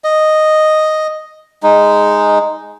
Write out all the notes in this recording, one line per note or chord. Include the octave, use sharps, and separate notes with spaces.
D#5
G#3 D#4